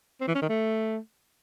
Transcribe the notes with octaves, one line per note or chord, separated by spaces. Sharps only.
C4
E3
C#4
D#3
A3